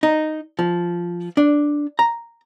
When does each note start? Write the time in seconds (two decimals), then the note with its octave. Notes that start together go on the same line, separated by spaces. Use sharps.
0.03 D#4
0.59 F3
1.37 D4
1.99 A#5